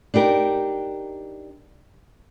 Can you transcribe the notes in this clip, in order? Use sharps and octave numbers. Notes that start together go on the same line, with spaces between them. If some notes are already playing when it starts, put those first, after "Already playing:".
D4 D#4 G4 A#4